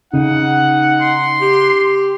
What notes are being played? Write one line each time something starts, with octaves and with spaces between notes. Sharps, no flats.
C#3 D#4 F#5
C6
G4